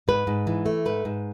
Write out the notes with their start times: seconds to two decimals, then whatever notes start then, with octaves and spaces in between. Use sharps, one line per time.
0.08 G#2 B4
0.27 G#2
0.47 E3
0.66 A3
0.85 G#2 B4
1.05 G#2